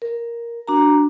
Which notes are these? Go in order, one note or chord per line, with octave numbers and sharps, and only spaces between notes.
A#4
D4 F#4 A#5